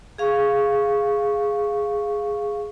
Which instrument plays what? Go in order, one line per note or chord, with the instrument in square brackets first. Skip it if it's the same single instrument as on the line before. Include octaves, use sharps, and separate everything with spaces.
[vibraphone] G#4 F5 C#6